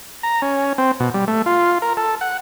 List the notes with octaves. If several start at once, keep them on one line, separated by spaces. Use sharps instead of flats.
A#5
C#4
C4
B2
G3
A3
F4
A#4
A4
F#5